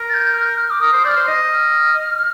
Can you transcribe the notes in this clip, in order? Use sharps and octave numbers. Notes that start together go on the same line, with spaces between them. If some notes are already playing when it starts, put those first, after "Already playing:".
Already playing: A#4
A6
G6
F6
G6
F6
D6
A#4 D#6
C5
D5 F6 G6
C5
D#5
F6